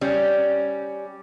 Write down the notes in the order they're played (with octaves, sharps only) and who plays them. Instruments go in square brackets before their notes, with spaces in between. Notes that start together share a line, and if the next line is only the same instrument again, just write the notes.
[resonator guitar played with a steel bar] G3 C#4